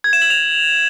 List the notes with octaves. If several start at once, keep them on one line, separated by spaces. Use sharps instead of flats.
G#6
E7
F#7
F7